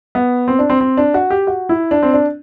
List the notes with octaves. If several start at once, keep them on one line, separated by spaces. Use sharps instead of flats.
B3
C4
D4
C4
C4
D4
F#4
G4
F#4
E4
D4
C4
D4